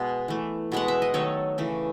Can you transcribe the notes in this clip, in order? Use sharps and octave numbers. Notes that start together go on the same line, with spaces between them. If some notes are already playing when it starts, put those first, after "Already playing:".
Already playing: B2 G#3 B3
E3 A3
B2 G#3 B3 F#5
E5
D#5
D#3 F#3 A3 A4 C#5
C#3 E3 A3